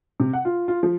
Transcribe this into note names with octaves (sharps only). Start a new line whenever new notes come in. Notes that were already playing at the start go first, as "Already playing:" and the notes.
C3
F#5
F4
F4
F3